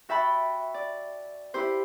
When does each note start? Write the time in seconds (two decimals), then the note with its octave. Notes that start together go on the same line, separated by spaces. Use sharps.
0.09 F#4 E5 G5 A5 B5
0.74 D5
1.54 E4 G4 C5